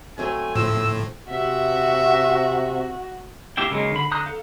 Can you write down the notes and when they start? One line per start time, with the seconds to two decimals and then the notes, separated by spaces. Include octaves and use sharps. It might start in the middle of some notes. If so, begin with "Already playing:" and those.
0.18 F#3 A3 C4 G#5
0.55 A2 F3 E6
1.30 C3 F#4 E5
3.57 A#3 E4 G4 E5 G5
3.71 C#3 F#3 G#3 A#3 D#4
3.92 D3 B5
4.11 D3 A#5 D#6 F#6 G6
4.26 A4 F5